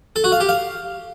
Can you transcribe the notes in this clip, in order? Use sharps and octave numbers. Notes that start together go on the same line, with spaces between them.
A4
F#4
F5
G4
F5